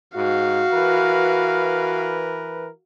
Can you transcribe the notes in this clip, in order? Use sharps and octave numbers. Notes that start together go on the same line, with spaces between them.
G#2 F#4 F5
E3 A#4 B4